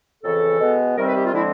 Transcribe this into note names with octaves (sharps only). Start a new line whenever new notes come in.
F2 C#3 E3 A4
B2 G#3 B3
C3 D#3 G3 C4 A#4
B4
G4
F4
D3 F3 G#3 C4 E4